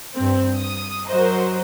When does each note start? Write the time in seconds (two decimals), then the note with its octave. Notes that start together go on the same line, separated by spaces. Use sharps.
0.16 G2 C4
0.59 D#6
1.10 F#3 F#4 A#4 C5 D#5